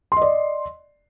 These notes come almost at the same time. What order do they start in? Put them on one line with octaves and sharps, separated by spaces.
C6 D#5 D5